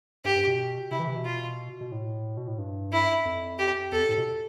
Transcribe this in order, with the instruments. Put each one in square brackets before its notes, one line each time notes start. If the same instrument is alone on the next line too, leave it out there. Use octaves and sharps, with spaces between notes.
[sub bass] G2 [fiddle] G4
[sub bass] G2
B2
[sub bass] C3 [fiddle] E4
[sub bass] E3
C3
B2
[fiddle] F4
[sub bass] B2
A2
B2
A2
G2
[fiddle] E4
[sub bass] F2
[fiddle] G4
[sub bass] E2 [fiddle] A4
[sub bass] F2
A2
B2